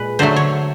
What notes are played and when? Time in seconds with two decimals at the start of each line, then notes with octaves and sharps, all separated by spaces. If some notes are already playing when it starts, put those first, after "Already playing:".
Already playing: A#2 G#3 B4
0.19 D3 F#3 A3 C5
0.36 C#5